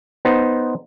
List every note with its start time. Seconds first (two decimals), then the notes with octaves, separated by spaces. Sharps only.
0.25 B3 D#4 C5